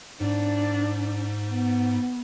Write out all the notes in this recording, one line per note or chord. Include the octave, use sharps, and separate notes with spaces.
G#2 D4
B3